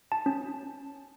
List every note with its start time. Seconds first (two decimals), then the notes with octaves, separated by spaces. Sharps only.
0.12 A5
0.26 C#4